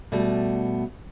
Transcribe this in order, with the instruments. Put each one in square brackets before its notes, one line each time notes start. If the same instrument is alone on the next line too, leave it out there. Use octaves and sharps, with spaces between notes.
[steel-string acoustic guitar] B2 G3 A3 B3